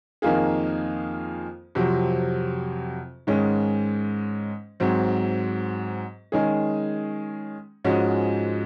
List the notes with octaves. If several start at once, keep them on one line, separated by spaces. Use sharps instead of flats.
F2 D#3 A#3 F4 G#4
F2 C3 F#3 C4
G#2 D#3 G#3 C#4
G#2 F#3 C4
D#3 G#3 C#4 G#4
G#2 F3 G#3 C#4 F#4